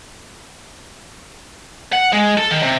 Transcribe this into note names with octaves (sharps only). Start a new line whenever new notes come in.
F#5
G#3
A4
D#3
C3